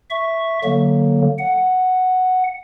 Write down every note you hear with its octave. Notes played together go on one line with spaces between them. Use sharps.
E5 C#6
D3 F#3 A#3
F#5